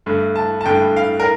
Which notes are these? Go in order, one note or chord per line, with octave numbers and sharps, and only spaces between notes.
G2 D3 A3
A5
A5
G2 D3 A3 G5
F5
A#4